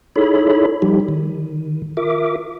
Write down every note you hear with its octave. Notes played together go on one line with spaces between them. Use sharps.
D#4 E4 G#4 A4 C#5 B5
F3 G3 D#4 G4
D#3
F4 A#4 E5 D6